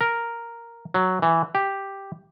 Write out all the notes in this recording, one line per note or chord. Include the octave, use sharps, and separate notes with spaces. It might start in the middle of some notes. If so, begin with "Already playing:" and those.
A#4
F#3
E3
G4